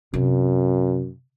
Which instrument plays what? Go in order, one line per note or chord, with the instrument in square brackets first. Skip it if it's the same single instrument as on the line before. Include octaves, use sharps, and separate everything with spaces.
[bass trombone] F#2 [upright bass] C3